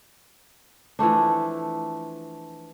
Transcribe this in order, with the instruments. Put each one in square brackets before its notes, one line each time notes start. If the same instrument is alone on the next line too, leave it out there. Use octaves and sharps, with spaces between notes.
[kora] E3 F3 A3 D4